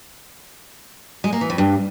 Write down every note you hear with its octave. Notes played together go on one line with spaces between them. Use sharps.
G#3
A#3
E3
F2
G2